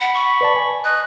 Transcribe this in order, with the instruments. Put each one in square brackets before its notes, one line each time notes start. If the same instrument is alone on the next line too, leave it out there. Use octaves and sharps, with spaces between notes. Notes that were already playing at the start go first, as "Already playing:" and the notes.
[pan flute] F#5 [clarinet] B5
[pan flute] C#6
[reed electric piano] B4 D5 A5
G#5
[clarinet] D#5 [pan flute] F#6